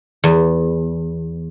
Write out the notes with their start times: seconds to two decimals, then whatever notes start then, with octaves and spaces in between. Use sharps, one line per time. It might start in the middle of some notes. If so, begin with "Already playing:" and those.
0.24 E2